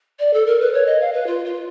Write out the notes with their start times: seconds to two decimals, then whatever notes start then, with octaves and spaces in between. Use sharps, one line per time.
0.19 D5
0.33 A4
0.46 A#4
0.60 B4
0.73 C#5
0.86 D#5
1.00 F5
1.12 B4
1.26 F4
1.44 F4